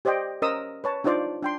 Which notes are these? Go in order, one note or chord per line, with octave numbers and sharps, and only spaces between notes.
G4 C5 D5 D#5 G5
C#4 A#4 C5 D#5 D#6 E6
B4 C#5 A5
D4 D#4 F4 C5 D5
D4 G5 C6